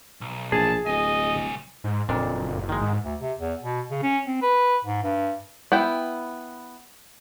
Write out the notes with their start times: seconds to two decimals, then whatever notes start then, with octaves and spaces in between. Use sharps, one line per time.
0.21 B1
0.52 A#1 G#4 A5
0.86 D1 C2 D#5 G#5
1.84 G#2
2.09 F#1 F2 A#2 D4
2.69 D#3 G#3
2.81 G#2
3.05 D2
3.21 C3
3.39 E2
3.62 B2
3.91 C#3
4.02 C#4
4.27 C4
4.42 B4
4.84 G#2
5.03 G2
5.72 B3 E4 G5